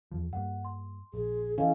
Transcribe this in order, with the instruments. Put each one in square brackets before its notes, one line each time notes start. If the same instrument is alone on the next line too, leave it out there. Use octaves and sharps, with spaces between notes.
[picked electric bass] E2 F3
[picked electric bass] G2 G3 A#3 [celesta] F#5
[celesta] C6
[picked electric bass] A#1 [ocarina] G#4
[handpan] E3 C#4 [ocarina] A4 [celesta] D#5 F5